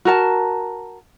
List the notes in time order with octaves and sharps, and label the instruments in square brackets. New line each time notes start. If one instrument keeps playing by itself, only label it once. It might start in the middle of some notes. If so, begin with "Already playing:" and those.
[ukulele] F#4 A#4 A5